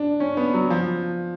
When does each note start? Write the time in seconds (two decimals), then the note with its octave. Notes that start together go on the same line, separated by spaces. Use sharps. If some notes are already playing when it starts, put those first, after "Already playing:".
Already playing: D4
0.20 C#4
0.37 B3
0.54 F#3
0.70 F3